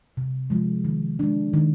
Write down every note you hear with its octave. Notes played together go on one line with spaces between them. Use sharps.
C3
F3 G#3
D#3
G#3 D4
D#3